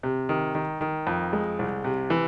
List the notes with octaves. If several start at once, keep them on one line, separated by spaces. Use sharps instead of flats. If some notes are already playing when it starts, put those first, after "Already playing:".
C3
D#3
D#3
D#3
F2
G#3
C2
C3
E3